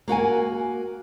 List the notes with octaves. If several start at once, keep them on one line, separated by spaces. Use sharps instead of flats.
A#3 F#4 F#5 G#5